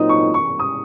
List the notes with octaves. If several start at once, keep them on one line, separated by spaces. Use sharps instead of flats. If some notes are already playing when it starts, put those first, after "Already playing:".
Already playing: A#2 F#3 C4 D#4 D#6
C#6
C#6
D#6